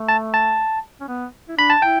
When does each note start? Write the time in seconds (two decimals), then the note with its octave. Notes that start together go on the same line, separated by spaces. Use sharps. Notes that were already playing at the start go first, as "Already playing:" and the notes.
Already playing: A3
0.08 A5
0.34 A5
1.01 C#4
1.08 B3
1.49 E4
1.57 D4 B5
1.70 A5
1.82 E4 G5